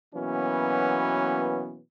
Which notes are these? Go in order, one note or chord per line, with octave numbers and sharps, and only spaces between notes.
B2 E3 F#3 A#3 B3 C#4